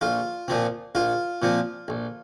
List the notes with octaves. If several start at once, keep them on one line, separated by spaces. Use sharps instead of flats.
A#1 F4
A#2 F3 C4
A#1 F4
A#2 F3 C4
A#1